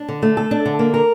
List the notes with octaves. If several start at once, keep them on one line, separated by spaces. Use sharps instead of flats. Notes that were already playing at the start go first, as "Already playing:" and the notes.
Already playing: D4
D3
A3
A4
D4
D3
A#3
A#4